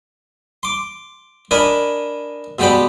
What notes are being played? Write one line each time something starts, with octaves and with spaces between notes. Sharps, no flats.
C6 D6
D4 A#4 D#5 G#5 B5
B2 G#3 G4 D5 B5